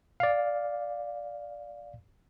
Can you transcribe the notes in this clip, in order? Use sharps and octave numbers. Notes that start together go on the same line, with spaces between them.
D5 F5